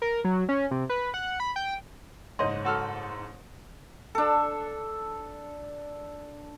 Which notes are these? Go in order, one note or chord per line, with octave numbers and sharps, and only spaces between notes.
A#4
F#3
C#4
C3
B4
F#5
B5
G5
F#1 G#2 C#5 D#5 C6
F#4 A4 F6
D4 A4